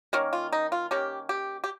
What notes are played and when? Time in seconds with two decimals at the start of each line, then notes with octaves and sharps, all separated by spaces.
0.13 D#3 A#3 C#4
0.33 F4
0.52 D#4
0.72 F4
0.91 D#3 A#3 C#4 G4
1.29 G4
1.64 G4